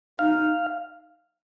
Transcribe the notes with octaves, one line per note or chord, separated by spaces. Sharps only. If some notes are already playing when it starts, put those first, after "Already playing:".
D#4 F5